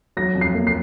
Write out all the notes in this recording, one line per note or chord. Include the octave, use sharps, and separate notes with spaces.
F#3 A#6
F2
C7
A#3
C7